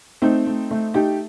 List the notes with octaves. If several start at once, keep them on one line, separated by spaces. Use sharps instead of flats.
A3 C4 D#4
A3
A3
A3 D#4 G4